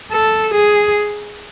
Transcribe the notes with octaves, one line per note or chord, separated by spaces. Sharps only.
A4
G#4